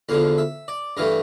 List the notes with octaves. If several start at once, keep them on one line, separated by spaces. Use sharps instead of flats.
E2 D3 F3 F5
E5
D5
G2 E3 A3 F5